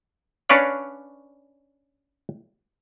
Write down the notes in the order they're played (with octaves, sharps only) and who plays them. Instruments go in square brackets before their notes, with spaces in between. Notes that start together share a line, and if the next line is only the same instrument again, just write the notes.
[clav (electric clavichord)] C#4 D4 B4 C#5 D5 F5